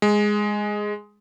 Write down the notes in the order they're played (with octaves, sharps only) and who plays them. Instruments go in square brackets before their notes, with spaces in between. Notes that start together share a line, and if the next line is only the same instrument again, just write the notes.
[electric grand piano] G#3